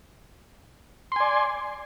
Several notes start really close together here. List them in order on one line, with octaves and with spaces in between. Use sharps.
C6 G#5 D5